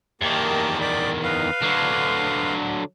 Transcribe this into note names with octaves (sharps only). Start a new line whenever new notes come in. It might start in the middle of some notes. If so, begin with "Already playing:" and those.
E2 D#3 A#3 G4 A5
D5 G5 B5
B4 F5
D3 F#3